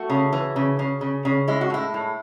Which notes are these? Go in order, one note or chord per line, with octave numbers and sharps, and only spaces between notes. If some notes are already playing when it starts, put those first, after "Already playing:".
Already playing: A3 F#4
C#3
E3
C#3
C#3
C#3
C#3
G#3 E4
F#4
A2 E4
A2